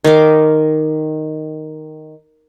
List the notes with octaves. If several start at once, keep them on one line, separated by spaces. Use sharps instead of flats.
D#3 F5 D6